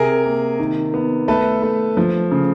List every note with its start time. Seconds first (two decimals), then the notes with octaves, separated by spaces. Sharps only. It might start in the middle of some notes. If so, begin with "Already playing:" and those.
Already playing: C3 G#4 A#4
0.24 A#3
0.59 D#3
0.94 B3
1.28 A3 A4 B4
1.62 A3
1.97 F3
2.32 C#3